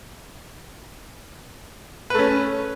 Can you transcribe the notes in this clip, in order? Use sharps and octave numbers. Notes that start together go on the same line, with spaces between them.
A3 C#4 B4